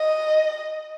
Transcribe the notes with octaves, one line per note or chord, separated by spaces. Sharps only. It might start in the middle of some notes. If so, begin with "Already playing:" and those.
Already playing: D#5